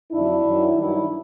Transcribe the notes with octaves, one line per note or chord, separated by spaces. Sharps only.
F2 D3 F#3 D4 E4
F#2 D#3 F#3
G2 D#3 F#3 D4 E4